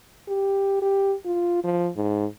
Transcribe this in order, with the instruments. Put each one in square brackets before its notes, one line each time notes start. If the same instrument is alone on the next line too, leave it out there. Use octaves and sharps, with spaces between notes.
[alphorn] G4
G4
F4
F3
G#2